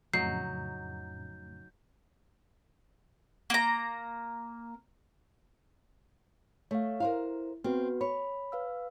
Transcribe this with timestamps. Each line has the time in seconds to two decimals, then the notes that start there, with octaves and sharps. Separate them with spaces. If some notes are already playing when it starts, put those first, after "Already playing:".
0.14 F2 A2 C#3 F#3 D#4 G6 C7
3.50 A#3 A#5
6.71 A3 C#5 F5
7.00 E4 A#4 C5 F5
7.64 B3 C4 F#4 B4
8.01 C#5 B5
8.52 B4 F5 E6